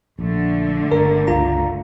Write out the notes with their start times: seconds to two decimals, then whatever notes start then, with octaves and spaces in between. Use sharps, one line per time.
0.19 A#1 D3 A3
0.92 G1 A#4
1.27 C#2 F4 A#5